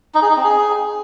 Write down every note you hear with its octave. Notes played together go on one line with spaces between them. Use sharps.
D#4
G#4
D#4
C4
G#4